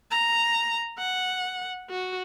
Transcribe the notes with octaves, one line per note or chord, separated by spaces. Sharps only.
A#5
F#5
F#4